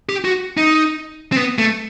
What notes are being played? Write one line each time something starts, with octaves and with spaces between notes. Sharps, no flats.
G4
F#4
D#4
C4
B3
A3